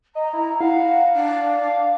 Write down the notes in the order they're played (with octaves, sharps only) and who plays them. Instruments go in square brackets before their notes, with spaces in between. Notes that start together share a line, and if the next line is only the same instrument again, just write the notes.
[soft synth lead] D#5 [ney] A#5
[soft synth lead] E4
[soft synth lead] F5 [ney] F#5
[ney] D4